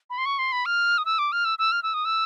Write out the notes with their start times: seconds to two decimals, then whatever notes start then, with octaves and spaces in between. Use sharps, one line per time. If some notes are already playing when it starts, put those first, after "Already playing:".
0.10 B5
0.18 C6
0.26 C#6
0.39 C6
0.52 B5
0.66 F6
0.98 D#6
1.05 E6
1.19 D6
1.32 F6
1.45 E6
1.59 E6
1.72 F6
1.83 E6
1.94 D#6
2.05 E6